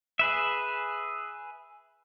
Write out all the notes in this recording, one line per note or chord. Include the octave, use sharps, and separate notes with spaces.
G#4 B4 E5